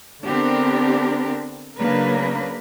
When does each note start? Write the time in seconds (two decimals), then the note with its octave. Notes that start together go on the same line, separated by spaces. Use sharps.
0.25 D3 B3 C4 D4 G4 A#4
1.79 C#3 F#3 A#3 D4 A#4 B4